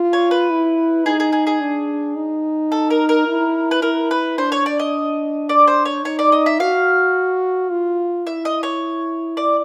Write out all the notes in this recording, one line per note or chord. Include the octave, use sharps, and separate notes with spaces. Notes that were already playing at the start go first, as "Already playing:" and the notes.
Already playing: F4
C#5
B4
E4
D#4 G#4
G#4
G#4
G#4
D4
D#4
A4
A#4
A#4
E4
B4
E4 A#4
B4
D4 C5
C#5
D5
D#5
D5
C5
C#5
D#4 C#5
D5
D#5
E5
F#4 F5
F4
E4 E5
D#5
C#5
D5